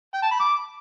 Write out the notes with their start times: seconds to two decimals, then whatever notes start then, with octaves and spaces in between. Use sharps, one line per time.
0.14 G5
0.23 A5
0.31 B5
0.40 D6